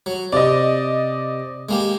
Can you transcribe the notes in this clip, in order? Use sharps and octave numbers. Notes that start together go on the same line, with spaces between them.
F#3
C3 D5 D#5
G#3 A#3 G4